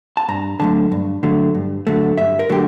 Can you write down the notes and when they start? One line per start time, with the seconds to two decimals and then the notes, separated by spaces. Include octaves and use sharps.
0.17 A5
0.29 G2 A#5
0.60 D3 F#3 A3 A5
0.92 G2
1.23 D3 F#3 A3
1.55 G2
1.87 D3 F#3 A3
2.18 G2 E5
2.39 A#4
2.49 D3 F#3 A3 G4